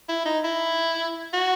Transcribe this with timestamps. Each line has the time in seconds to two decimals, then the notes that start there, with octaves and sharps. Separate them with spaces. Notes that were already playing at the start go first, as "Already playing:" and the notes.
0.09 E4
0.26 D#4
0.44 E4
1.34 F#4